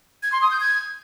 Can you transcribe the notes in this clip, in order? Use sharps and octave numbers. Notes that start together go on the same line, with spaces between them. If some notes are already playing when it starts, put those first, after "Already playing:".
G#6
C6
D#6
G6
G#6